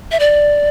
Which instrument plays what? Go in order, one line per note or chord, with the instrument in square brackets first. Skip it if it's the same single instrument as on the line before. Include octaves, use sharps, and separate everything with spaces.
[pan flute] E5
D5